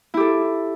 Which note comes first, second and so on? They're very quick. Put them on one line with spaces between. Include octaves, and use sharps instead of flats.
E4 G4 A4